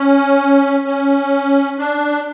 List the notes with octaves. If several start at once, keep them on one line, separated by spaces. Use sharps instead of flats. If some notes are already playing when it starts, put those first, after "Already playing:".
Already playing: C#4
C#4
D4